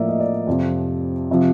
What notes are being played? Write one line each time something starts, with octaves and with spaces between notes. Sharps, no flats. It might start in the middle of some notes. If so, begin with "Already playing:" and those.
Already playing: A2 F3 A#3 D5 E5
D#5
D5
F2 C3 F3
C3 F3